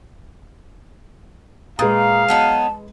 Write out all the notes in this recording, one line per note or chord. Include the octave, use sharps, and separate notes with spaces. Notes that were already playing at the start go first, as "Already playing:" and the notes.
A#2 G#3 B4 F5 A#5 D#6
F#3 B3 D#4 A5